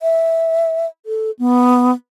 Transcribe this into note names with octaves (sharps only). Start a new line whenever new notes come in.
E5
A4
B3